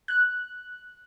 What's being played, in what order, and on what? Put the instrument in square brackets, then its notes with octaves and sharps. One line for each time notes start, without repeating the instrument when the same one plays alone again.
[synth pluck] F#6